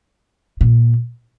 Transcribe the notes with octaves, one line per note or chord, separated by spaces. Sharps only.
A#2